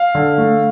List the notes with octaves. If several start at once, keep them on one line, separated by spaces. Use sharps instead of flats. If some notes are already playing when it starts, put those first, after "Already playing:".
Already playing: F5
D3
A3